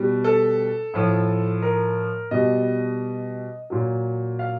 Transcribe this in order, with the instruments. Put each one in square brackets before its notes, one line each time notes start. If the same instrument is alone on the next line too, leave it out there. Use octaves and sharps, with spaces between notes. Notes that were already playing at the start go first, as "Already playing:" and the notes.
Already playing: [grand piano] B2 G3
A4
A2 F3
A#4
B2 G3 D#5
A#2 F#3
F5